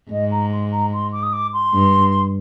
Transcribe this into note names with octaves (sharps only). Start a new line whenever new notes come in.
G#2 D#5
A#5
C6
A#5
C6
D6
D#6
D6
C6
G2